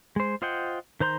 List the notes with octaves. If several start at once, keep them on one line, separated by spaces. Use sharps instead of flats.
G#3 C5
F4 C5 D#5 F#5 G5
D#3 C5 A#5 C6 G6